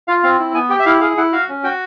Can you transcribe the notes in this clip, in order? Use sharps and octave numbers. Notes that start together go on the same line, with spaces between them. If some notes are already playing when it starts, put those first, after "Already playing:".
F4 F5
C4 F5
E4
B3 G#5
G4 G5
E5
E4 F5
G#4 F5
E4 F#5
F#4 F5
C#4
F#4 G5